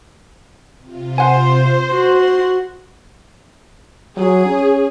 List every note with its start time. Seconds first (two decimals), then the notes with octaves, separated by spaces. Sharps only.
0.79 C3 F4
1.18 C5 F#5 G#5
1.93 F#4 C6
4.17 F#3 G#4
4.46 C#4